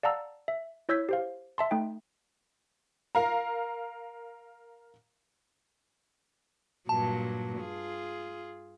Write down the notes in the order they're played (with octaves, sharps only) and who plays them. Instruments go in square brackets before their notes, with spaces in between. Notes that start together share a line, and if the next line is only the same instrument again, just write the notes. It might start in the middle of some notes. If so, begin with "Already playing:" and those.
[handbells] D5 F5 F#5 A5 A#5 E6
E5
E4 C#5 E6 G6 G#6 B6
G4 C5 F5
E5 A5 C6
A3 D#4 G5
[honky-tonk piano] A#4 F5 A#5
[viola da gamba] G2 A#2 F#3 [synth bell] A5
[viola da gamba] F4 G#4